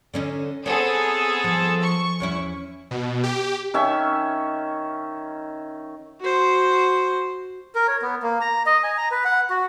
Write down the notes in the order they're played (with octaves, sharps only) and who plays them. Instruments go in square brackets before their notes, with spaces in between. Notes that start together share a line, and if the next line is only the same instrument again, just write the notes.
[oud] D3 C#4 D#4
[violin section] B3 G#4 A4 [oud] C4 C#5
[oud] F3
[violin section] C#6
[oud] E2 C#4 E4
[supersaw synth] B2
G4
[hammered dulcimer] D#3 C#4 E5
[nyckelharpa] F#4 C5
[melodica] A#4
C#5
B3
A#3
A#5
D#5
G#5
A#5
B4
F#5
F#4